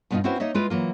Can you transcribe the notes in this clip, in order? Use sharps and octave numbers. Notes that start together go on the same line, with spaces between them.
G2 B2 B3 C#4 D#4 F4
C4 C#4 E4 F#4 B4 C5
A#3 D#4 C#5 D#5 E5
G#3 E4 F4 B4
E3 F#3 A#3 F4